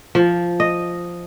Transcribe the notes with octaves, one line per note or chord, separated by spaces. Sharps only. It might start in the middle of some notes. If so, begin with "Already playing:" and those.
F3
D#5